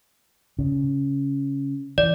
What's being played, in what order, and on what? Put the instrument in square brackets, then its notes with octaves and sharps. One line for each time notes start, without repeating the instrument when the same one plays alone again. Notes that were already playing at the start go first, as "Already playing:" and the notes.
[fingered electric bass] C#3
[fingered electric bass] E3 [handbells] D5